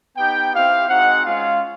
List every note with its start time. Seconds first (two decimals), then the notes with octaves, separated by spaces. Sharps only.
0.17 B3 D#4 G4 G5
0.54 C4 E4 G4 F5
0.89 G#3 C4 D#4 F#4 F#5
1.25 G#3 C#4 F4 F5